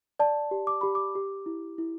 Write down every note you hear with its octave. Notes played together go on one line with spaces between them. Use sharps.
D5 A5
G4
D6
G4 B5
D6
G4
E4
E4